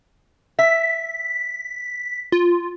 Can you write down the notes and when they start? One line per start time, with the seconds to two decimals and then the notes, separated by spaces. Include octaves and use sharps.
0.59 E5 B6
2.32 F4